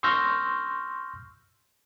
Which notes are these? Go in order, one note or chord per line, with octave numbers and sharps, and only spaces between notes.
C6 C#6 E6 F6 G6 A#6